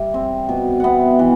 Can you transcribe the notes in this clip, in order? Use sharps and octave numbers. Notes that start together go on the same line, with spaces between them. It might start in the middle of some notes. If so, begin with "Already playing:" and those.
Already playing: G3 E5
C4
B2
B3 E5 F#5
E3 F#5